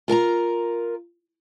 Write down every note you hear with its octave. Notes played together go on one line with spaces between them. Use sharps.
F4 A#4 A5 A#5